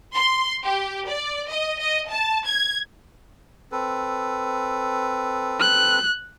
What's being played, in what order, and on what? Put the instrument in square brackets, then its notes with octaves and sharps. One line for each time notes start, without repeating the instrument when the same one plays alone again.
[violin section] C6
G4
D5
D#5
D#5
A5
G#6
[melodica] C4 A4 B4
[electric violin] F#6